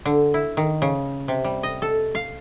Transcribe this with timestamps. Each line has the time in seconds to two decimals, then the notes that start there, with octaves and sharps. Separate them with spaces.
0.05 D3
0.34 E4
0.57 D#3
0.82 C#3
1.28 C3
1.44 G3
1.63 D#5
1.82 A4
2.15 F5